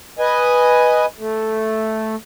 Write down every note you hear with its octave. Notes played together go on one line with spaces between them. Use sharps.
B4 D#5 G#5
A3